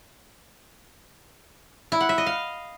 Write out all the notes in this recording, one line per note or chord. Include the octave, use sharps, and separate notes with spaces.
E4
F#5
E5
D#5
F5